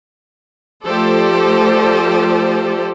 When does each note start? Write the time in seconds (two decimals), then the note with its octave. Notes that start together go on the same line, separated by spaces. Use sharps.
0.83 F3 A3 G4 A4 C5 D5